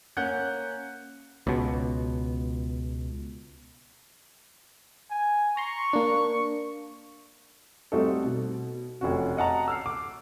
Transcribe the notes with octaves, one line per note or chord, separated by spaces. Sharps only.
A#3 C#4 F#5 F#6 G6
C#2 B2
G#5
A#5 C6 C#6
A#3 D4
G3 A3 C4 D#4 F#4 A4
B2
F1 C#4 F#4
D#5 F#5 A5 A#5
E6 F6 C7
D6